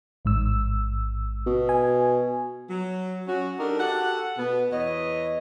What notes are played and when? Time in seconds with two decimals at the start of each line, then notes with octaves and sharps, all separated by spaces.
0.25 A1 G#2 E6
1.46 B2
1.69 G#5
2.70 F#3
3.27 F#3 C#4 F#4
3.59 D4 D#4 G4 A4 A#4
3.79 F#4 G4 A4 F#5
4.38 B2 B3
4.72 E2 B4 C#5 D#5